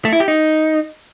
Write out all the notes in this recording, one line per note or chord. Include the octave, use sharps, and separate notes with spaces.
A3
E4
G4
D#4